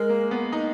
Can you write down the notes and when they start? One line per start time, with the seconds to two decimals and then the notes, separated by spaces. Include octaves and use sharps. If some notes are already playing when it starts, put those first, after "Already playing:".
Already playing: G#3 A#4
0.10 A#3
0.31 B3
0.52 D#4